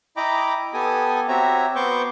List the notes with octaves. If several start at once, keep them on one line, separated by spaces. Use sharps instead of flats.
E4 D#5 G5 A#5 B5 D6
B3 G4 A4 G#5 D#6
C4 F#4 G4 C#5 E5 A#5
B3 C5 C#6 D6 G6